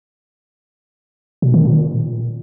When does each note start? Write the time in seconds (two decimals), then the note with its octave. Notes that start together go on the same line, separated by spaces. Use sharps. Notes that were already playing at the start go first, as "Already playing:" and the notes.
1.42 B2
1.54 D#3
1.65 A#2